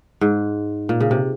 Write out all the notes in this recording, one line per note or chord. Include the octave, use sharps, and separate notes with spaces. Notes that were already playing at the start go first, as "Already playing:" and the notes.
G#2
A#2
C#3
C3